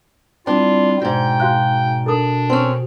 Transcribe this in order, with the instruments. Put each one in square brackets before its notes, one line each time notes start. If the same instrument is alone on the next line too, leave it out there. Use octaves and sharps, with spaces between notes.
[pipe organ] G3 C4 E4 [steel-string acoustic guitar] D4 [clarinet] F4
[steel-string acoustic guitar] E2 G#2 [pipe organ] B2 [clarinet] G5
[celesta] F#4 F5 F#6
[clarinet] D4 [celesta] A4 A#4 D#6
[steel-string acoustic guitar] C4 C#4